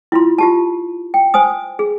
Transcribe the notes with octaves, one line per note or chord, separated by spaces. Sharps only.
E4 F4 C6
F4 G4 A5
G5
C5 G#5 D#6
G#4